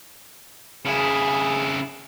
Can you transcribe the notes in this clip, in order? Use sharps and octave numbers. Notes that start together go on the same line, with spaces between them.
C#3 E4 G#4